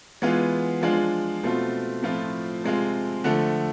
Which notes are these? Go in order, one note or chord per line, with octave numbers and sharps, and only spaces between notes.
E3 G#3 B3 F4
F3 G#3 D4 F4
B2 A3 C4 F4
A2 F3 A3 C4 F4
C3 G#3 C4 F4
D3 F3 A3